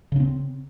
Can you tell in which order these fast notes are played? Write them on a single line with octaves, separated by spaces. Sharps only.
C#3 C#4 C4